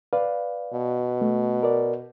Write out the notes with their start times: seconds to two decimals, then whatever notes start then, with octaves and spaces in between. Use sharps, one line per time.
0.13 B4 D5 F5
0.73 B2
1.21 A3
1.63 A#4 D5